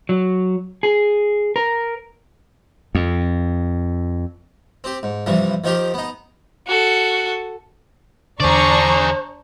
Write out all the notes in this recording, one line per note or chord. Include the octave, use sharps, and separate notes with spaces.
F#3
G#4
A#4
F2
C4 G4
G#2
G2 C3 E3 F3
D#3 F3 D#4 F4 G4
B3 D#4
F#4 A4
E2 D3 D4 G#4 C5 D5 A#5 C#6